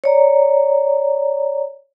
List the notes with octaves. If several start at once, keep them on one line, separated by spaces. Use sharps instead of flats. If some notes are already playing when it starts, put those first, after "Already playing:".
C#5 D5 A#5